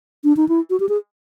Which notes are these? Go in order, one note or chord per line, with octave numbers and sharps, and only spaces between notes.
D4
D#4
E4
F#4
G4
G#4